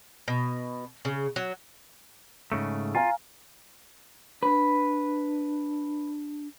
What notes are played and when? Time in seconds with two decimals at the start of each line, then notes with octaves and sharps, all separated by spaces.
0.28 B2
1.05 C#3
1.36 F#3
2.52 G#2 C#3 A3
2.95 F4 F5 G#5 A#5
4.43 D4 B4